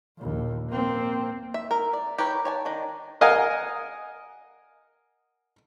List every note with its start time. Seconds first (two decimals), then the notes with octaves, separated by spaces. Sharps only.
0.18 A#1 D#2
0.70 A#3 C4
1.54 E5
1.71 A#4
1.93 D5
2.18 G4 A#4 B4 C#5
2.45 C#5 G#5 A5
2.65 D#3 D4
3.21 A#4 D#5 F5 F#5 G#5